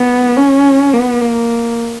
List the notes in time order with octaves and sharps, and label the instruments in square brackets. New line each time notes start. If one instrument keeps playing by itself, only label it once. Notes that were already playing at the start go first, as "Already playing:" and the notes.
Already playing: [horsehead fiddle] B3
C#4
B3
A#3